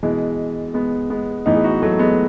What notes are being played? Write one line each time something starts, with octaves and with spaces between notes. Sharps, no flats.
B2 E3 G#3
G#3 B3
G#3 B3
A2 E3 B3 D#4
G#4
D#4 F#4
F#3 A3
G#3 B3